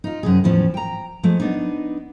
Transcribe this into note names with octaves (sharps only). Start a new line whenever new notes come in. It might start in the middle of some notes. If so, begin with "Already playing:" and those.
D#4 F4
F#2 C3 G#4
E2 A2 F3 C#4
G5 A#5
F3 G#3 A3
B3 D4 D#4